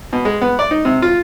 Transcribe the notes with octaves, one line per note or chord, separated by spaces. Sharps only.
B2
G#3
B3
D5
D#4
C3
F4